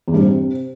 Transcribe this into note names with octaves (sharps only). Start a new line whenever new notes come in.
E2
G2
C3